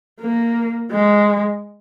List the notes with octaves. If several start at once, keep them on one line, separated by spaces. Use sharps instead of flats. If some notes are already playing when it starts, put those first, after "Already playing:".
A#3
G#3